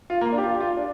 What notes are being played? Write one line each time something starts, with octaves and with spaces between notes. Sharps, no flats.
F4
A#3
D4
G4
F4
G4
F4
D4